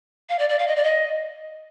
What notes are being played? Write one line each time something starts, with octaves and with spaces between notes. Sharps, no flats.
F5
D5
D5
F5
D#5
D5
D#5